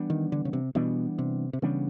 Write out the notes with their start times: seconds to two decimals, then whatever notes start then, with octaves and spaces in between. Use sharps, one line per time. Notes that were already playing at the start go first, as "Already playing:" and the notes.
Already playing: E3 G3 B3 D4
0.10 D#3
0.32 D3
0.45 C#3
0.53 C3
0.75 B2 E3 G3 B3 D4
1.19 C3
1.53 C3
1.62 C#3 E3 G3 B3 D4